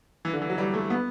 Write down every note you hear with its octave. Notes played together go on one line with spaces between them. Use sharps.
E3
D3
E3
F#3
G3
A3
B3